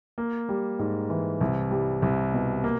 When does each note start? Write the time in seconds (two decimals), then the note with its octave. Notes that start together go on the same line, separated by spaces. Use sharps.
0.18 A#3
0.49 G3
0.79 G#2
1.10 E3
1.41 C2
1.71 G3
2.02 C2
2.33 B2
2.64 A#3